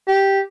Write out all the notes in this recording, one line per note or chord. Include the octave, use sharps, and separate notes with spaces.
G4